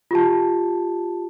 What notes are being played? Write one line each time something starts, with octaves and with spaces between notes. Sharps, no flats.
F4 G4 A5